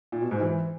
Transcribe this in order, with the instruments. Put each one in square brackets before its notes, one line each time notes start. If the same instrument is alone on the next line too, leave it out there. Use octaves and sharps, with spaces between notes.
[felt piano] A#2
B2
G#2
E3